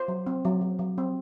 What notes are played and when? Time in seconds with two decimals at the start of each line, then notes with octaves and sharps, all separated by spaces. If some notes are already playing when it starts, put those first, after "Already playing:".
Already playing: C5
0.08 F#3
0.26 C4
0.45 F#3
0.61 F#3
0.79 F#3
0.98 C4